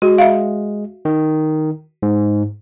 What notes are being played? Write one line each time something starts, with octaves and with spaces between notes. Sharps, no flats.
G#3 F#4
E5 F5
D#3
G#2